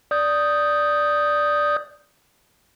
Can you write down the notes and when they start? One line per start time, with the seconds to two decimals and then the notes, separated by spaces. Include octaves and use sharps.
0.11 D5 D#6 G6